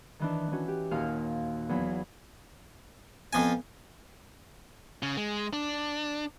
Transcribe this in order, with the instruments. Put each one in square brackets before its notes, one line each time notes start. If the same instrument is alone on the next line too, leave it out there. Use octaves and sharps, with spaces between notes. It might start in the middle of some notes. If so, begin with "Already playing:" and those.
[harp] D#3 E3 D4
E3 C#4 F#4
G4
D#2 A#2 F#4 F5 F6
E2 F#3 B5
[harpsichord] F2 F3 G#5 [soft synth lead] B3
[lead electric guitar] C#3
G#3
D4